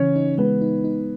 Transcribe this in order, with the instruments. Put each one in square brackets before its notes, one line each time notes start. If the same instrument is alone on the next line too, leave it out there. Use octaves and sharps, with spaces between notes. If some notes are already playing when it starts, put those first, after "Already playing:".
Already playing: [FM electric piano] C#3 E3 [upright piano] C#4 C#5
[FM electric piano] D#4
[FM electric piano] G#3 [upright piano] B3 B4
[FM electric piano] D#4
D#4